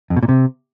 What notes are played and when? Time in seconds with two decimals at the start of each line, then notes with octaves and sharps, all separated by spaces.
0.10 F2
0.16 B2
0.23 A#2
0.29 C3